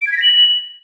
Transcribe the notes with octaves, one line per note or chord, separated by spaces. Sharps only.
D7
G#6
B6
A#6
F#7